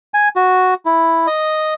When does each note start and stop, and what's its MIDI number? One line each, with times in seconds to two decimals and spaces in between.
0.14 0.28 80
0.36 0.74 66
0.86 1.27 64
1.27 1.74 75